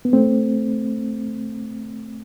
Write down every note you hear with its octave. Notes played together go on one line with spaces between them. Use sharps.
B3
A3 C4